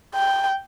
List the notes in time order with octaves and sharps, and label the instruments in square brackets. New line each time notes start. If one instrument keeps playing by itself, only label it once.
[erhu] G5